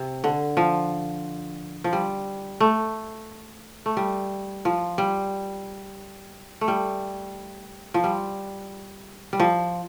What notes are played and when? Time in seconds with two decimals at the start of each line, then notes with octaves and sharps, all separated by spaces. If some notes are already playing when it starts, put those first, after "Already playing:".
Already playing: C3
0.24 D3
0.57 F3
1.84 F3
1.93 G3
2.60 A3
3.86 A3
3.97 G3
4.65 F3
4.98 G3
6.61 A3
6.68 G3
7.94 F3
8.04 G3
9.33 G3
9.40 F3